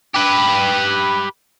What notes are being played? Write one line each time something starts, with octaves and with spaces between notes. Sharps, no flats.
G4 B4